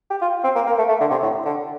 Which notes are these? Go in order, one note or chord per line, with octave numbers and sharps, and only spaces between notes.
G4
F4
C4
A#3
A#3
A3
A3
D3
C3
A2
D3